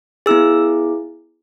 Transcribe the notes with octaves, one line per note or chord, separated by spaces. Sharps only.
B3 E4 G#4 E6